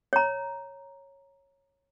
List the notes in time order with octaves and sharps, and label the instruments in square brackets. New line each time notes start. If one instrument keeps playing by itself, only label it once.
[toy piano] C#5 A#5